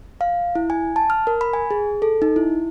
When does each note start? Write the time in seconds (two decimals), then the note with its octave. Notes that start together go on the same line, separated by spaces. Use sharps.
0.21 F5
0.55 E4
0.70 G#5
0.96 A5
1.10 F6
1.27 A#4
1.41 B5
1.53 G#5
1.71 G#4
2.02 A4
2.22 D#4
2.36 E4